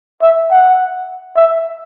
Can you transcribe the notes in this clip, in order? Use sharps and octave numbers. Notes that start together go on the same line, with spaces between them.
E5
F#5
E5